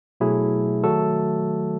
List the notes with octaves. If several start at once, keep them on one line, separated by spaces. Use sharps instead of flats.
B2 F#3 A3 E4 G#4
D#3 F#3 A3 F#4 A4